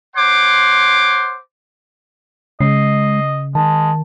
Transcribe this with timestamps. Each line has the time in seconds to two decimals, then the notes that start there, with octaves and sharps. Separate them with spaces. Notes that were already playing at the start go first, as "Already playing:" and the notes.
0.16 C5 C#5 F#5 C6 D6
2.61 C#3 G#3 D#5 C7
3.55 D#3 G#3 A5